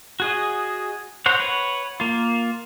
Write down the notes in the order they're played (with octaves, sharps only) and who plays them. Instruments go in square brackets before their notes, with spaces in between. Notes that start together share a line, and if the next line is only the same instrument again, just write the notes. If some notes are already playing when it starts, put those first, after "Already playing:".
[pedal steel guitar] F#4 G#4 D#5
A#4 C5 C#5 F#5
B4 C#5 F#5
A#3 F4